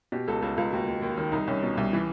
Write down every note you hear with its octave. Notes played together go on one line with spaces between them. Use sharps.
B2 G4
C#2 A4
C#2 A4
C#2 F4
D#2 F#4
D#2
D#2
D#3
C2 D#4
C2 C#4
B2
C2
E3